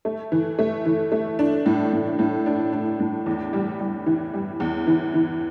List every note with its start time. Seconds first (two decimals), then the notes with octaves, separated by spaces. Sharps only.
0.05 A3
0.32 E3
0.59 A3
0.86 E3
1.12 A3
1.39 D4
1.66 A2
1.93 A2
2.19 A2
2.46 D4
2.73 D4
3.00 A2
3.26 E2
3.53 G3
3.80 G3
4.06 E3
4.34 G3
4.60 E2
4.87 E3
5.14 E3